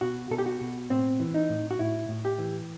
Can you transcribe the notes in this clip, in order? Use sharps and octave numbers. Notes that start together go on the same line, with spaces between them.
B2 F#4
B2 A4
G4
F#4
B2
A2 C4
E3
D#4
A2
F#4
A2 E4
A2
G4
E3